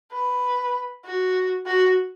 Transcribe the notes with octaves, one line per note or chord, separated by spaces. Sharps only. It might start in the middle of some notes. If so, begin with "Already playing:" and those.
B4
F#4
F#4